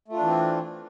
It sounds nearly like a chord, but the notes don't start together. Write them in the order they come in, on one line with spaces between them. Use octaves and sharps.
A3 F4 D4 E3 C4